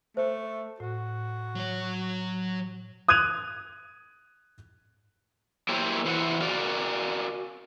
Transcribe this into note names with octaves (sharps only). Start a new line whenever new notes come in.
A3 C5
A2 F#4
F#3 C#5
D#6 F#6 G#6 D#7 F7
F#3 A#3 E4 G4 C5 C#5
E3 E4 C5 D5 F#5
F#4 A#4 D5 F5